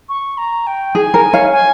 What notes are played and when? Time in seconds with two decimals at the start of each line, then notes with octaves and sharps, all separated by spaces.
0.09 C#6
0.38 A#5
0.67 G5
0.95 G#4 G#5
1.14 A#4
1.33 C#5 F5
1.52 G#5